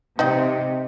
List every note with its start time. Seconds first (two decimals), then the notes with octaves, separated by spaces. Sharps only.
0.19 C3 D#4 D5 D#5 G5